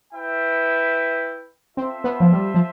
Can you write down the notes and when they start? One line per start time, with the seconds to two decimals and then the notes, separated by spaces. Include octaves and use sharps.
0.13 E4 B4 E5 G5
1.77 C4 F4 A4 C5 E5
2.04 B3
2.20 F3
2.32 G3
2.54 F3